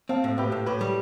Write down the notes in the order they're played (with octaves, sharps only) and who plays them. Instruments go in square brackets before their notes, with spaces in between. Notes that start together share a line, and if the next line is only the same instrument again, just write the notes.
[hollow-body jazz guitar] C4 [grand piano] F5 A5
[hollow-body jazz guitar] A2
[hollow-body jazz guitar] A2 [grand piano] G4 B4
[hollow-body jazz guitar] A2
[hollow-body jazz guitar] A2 [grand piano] G4 B4
[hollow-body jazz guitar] G3